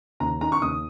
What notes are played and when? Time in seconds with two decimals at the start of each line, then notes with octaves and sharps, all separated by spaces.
0.20 D#2 A#5
0.41 D#3 A#5
0.52 C#6
0.62 D#2 D#6